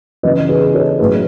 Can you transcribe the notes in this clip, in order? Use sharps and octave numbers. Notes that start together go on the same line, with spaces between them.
C#3 E3 B3 B4 D#5
G#4 B4
A4 C#5
A2 F#3 A3 C#4 E4 G#4 B4